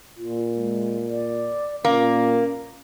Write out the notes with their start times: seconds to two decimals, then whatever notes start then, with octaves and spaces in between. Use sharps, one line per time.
0.17 A#2 F4
0.55 G#3
1.09 D5
1.85 A#2 A#3 C#4